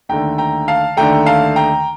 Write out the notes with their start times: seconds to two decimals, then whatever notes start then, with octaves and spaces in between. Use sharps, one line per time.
0.09 D#2 D3 A3 G5 A#5
0.38 G5 A#5
0.68 F5 A5
0.97 D#2 D3 A3 G5 A#5
1.26 F5 A5
1.56 G5 A#5